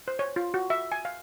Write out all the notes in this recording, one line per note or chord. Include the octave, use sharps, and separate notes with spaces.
C5
C#5
F4
F#4
E5
G#5
F5